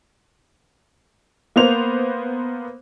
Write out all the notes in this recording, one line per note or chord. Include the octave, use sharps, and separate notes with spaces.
A#3 B3 C5 F7